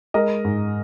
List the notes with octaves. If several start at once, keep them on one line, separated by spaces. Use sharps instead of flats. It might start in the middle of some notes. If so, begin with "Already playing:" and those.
G#3 A#4 D#5
G#2